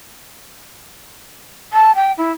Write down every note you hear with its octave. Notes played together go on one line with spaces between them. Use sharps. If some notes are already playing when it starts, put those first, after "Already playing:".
A5
G5
E4